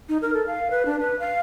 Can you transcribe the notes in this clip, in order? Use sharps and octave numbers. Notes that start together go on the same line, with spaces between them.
D#4
A#4
A4
F5
B4
D4
B4
F5